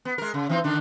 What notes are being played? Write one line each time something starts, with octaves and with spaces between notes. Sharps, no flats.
B3
G#3 A#4
C#3
E3 C4 D#4
D3 D#3 D4